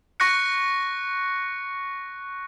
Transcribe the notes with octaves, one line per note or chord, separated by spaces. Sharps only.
C#6 F#6 A#6 C#7